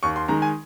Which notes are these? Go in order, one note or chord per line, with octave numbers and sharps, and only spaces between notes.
D#2 C#6
C6
D#3 G#3 A#5
G#5